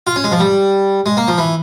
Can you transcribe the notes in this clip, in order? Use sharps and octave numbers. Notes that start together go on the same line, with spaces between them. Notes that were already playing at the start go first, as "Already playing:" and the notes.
F4
C#4
G#3
F3
G3
G#3
A#3
F3
E3